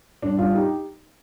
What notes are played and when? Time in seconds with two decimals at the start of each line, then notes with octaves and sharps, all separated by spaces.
0.22 G2 D4
0.38 G2 D4 F4
0.54 D#4 G4